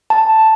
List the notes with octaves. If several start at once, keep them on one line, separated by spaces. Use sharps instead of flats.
A5